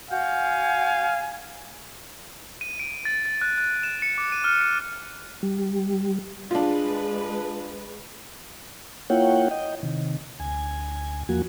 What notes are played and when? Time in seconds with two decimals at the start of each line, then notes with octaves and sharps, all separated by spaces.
0.11 F#4 F5 F#5 G#5 G6
2.61 D#7
2.79 D7
3.05 A6
3.26 A6
3.41 F#6
3.58 F#6
3.83 E7
4.02 C#7
4.18 D6
4.32 D#7
4.44 F6
4.61 C#7
5.43 G3
6.51 G#3 D4 F4 B4
9.10 A#3 E4 F4 C#5 F#5 G5
9.51 D#5 G5
9.83 C3 D#3
10.40 D2 G#5
11.29 E2 F3 A#3 F#4 G#5